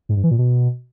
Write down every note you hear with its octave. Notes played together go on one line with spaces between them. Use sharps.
G#2
G2
E3
A#2
B2